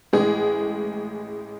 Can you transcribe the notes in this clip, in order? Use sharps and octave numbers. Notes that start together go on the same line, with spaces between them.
A1 A2 G#3 G#4